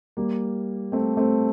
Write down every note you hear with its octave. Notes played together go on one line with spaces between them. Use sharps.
G3 A#3
A3 C4
A3 C4